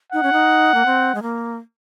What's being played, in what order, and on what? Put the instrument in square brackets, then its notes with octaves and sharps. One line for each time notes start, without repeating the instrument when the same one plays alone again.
[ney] D#4 [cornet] F#5
[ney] C#4
D#4
A#3
C4
G#3
A#3